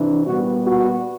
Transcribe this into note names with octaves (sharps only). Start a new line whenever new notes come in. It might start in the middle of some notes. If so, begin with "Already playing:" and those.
Already playing: C3 E3 D4
A#2 G3 B3 F#4
F#4